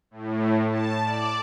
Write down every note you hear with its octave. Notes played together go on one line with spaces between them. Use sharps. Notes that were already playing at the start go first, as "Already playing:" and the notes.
A2
A5
D5